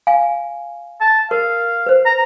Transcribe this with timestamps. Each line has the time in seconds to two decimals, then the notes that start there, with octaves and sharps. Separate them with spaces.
0.07 F5 G#5
1.01 A5
1.31 A#4 F5
1.86 B4 C5
2.06 A#5